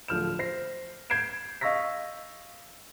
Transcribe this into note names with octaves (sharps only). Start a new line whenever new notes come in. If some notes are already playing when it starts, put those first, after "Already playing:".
D1 D3 F3 F6 G6 E7
C5 A#6 C7
G6 G#6 C7 D7 E7
D#5 F5 C#6 E6 A#6 B6